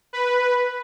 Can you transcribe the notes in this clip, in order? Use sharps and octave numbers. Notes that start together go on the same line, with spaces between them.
B4